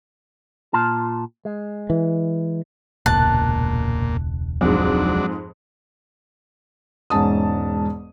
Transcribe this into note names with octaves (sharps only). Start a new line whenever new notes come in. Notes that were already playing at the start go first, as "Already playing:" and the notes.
A#2 F4 A5
G#3
E3
E1 C#2 A#2 A5 F#6
F2 G#2 F#3 D4
E1 G#2 C#4 A5 D#6